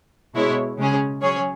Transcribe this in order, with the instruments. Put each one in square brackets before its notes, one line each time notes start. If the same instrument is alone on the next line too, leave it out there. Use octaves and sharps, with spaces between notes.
[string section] B2 G#3 E4 C#5
C#3 G#3 C#4 G#4
F#3 C#4 G#4 C#5